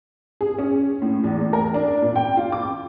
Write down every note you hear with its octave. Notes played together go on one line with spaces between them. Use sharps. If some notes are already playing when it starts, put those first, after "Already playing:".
G#4
C#4
A2
E2
A2
A#4
D4
A#2
G5
F4
D6